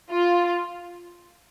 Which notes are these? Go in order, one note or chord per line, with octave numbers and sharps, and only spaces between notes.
F4